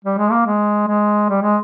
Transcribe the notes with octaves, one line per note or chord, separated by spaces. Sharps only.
G3
G#3
A#3
G#3
G#3
G3
G#3